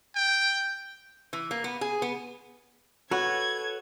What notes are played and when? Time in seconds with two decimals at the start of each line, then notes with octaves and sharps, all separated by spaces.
0.16 G5
1.33 E3
1.51 A#3
1.64 B3
1.81 G#4
2.02 B3
3.11 F#4 A4 B4 C#5 G#6